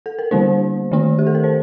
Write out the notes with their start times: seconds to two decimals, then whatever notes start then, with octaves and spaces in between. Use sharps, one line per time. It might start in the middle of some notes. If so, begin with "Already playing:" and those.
0.06 A4
0.19 A#4
0.31 D3 G3 A#3 D4 C5
0.91 D#3 A3 D4
1.19 G4
1.27 A4
1.35 A#4
1.44 C5